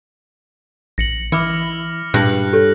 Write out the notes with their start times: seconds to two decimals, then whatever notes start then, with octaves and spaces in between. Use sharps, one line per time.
0.98 A#1 A#6 C#7 F#7
1.32 E3 E4 D6 F6 C#7
2.14 G2 A#2 F#6 A#6 F#7
2.53 G4 A4 C#5